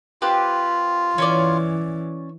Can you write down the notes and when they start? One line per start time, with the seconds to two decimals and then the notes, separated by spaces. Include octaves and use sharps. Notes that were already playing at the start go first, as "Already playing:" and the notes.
0.22 C4 F4 G4 B4
1.18 E3 C#4 C#5 D5